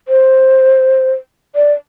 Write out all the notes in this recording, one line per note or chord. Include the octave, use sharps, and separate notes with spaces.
C5
D5